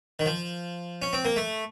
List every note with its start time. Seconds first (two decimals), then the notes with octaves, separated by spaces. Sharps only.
0.19 D#3
0.26 F3
1.02 C#4
1.13 C4
1.25 A#3
1.36 A3